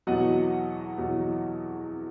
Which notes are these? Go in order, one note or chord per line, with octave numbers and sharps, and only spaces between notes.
E2 B2 F#3 D#5 F#5
E2 B2 F#3